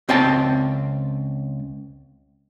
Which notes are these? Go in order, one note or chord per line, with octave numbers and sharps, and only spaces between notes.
C#2 C4 F5 G5 A5